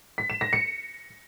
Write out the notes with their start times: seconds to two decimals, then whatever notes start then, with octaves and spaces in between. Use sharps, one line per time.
0.18 B6
0.30 E7
0.41 A#6
0.53 C#7